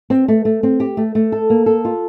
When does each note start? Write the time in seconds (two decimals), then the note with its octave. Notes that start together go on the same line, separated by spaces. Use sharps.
0.10 C4
0.28 A3
0.45 A3
0.63 C4
0.80 G4
0.97 A3
1.15 A3
1.32 A4
1.50 A#3
1.66 A4
1.85 F4